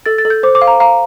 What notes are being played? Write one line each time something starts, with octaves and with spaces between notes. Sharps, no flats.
A4 A6
A6
A4
G6
C5 D6
D6
F5
A#5
F5 A#5